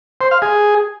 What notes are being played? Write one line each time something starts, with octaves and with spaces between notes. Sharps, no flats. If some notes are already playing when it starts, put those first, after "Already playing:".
C5
F5
G#4